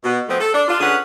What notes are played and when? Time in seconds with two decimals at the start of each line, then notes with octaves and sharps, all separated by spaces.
0.03 B2
0.28 B2 F3 A3 B3 C4
0.40 A4
0.54 D4
0.68 D4 F4
0.80 D3 C#4 G#4 B4 F#5